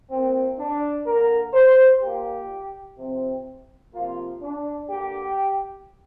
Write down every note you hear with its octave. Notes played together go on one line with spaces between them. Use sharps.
A#2 A#3 C4
D4
D3 A#3 A#4
C5
A#2 A#3 G4
C3 F3 C4
C3 F3 A#3 F4
D4
D3 A#3 G4